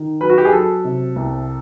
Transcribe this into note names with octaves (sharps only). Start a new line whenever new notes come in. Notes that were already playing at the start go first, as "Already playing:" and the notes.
Already playing: D#3
F#3 B4
F#4
G4
G#4
F#3 A4
C3
C2